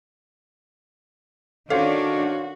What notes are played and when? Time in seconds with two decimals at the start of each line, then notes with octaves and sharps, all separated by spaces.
1.70 D#3 C#4 D4 F#4 A4 C5 C#5 F5